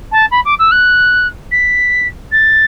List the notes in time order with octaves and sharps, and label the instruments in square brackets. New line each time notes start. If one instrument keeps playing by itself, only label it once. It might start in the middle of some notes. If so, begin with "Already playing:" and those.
[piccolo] A5
B5
D6
E6
F#6
B6
A6